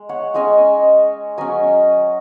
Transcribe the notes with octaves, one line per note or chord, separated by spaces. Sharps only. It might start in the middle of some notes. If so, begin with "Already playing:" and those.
Already playing: G#3
C#5 F#5
G#3 C#4 D#5 G#5
F#3 C#4 D#5 G#5